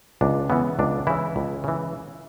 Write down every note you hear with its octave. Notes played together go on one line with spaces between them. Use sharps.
C#2 D4
C#3 E3 B3
C#2 D4
C#3 E3 E4
C#2
C#3 E3